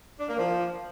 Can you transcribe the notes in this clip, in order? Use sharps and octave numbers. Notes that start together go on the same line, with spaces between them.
D4
A#3
F3